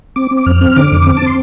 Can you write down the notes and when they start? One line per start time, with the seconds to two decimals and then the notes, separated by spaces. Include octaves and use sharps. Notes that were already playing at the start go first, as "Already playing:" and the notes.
0.16 C4 D6
0.31 C4
0.37 D6
0.46 F2 F6
0.61 C4
0.76 D3 D6
0.92 F2
1.07 C4
1.17 A5
1.22 C4 C6